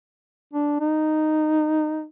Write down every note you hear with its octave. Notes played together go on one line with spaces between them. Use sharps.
D4
D#4